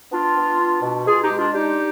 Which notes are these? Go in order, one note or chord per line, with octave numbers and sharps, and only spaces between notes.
B3 D4 F4
B3
D4
B2
B2 F4 G#4
D#4 G4
G#3
D4 F4
D4 D#4 G4